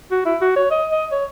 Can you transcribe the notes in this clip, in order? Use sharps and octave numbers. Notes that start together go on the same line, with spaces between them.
F#4
E4
F#4
C#5
D#5
D#5
C#5